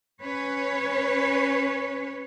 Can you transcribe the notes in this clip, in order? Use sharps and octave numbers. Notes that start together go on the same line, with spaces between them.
C#4 B4 C#5